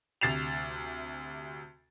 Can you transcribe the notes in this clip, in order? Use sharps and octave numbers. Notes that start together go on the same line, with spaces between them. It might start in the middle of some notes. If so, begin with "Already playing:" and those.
D2 C3 A6 C7 E7 F7